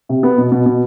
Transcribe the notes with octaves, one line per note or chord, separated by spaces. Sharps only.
C3
B3
B2
B2
B2